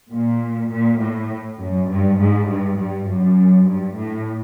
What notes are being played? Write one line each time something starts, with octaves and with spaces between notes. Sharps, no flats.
A#2
A#2
A2
F#2
G2
G#2
G2
G2
F#2
G2
A2